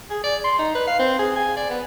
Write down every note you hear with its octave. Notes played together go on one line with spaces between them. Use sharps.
G#4
D5
C6
D#4
B4
F5
C4
G#4
G#5
D5
B3